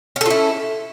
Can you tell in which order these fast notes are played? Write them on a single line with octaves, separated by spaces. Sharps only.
C#4 A4 F4 E4